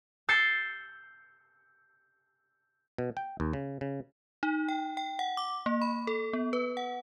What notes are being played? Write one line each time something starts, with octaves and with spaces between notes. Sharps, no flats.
E6 G6 A6 C7 C#7
B2
G5
D#2
C#3
C#3
D#4
G5
G5
F#5
D6
A#3
B5
A4
B3
B4
F#5